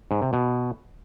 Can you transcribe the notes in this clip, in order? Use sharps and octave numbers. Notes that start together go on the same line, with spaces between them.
G#2
C3
B2